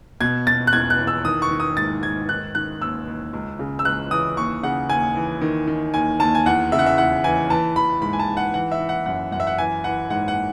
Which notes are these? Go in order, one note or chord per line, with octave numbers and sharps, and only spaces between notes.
B2 G#6
B2 A6
F#6
E2 G#6
F#6
E2
E6
D#3 D#6
C#6
D#3
D#6
G#2 A6
G#2 G#6
D#3 F#6
D#3 F#6
D#2 E6
D#2
C#2
C#3
E6
C#2 F#6
E3 D#6
D#2 C#6
C#3 F#5
D#2 G#5
E3
D#3
D#3
D#2 G#5
D#2 A5
G#5
E2 F#5
C#3 E5
F#5
E5
E2 F#5
E3 G#5
E3 A5
E3 B5
G#2 B5
G#5
A5
G#2
F#5
E3 F#5
E5
E3
F#5
F#2 F#5
F#2 F#5
E5
F#5
E3 G#5
E3 F#5
G#2 F#5
F#5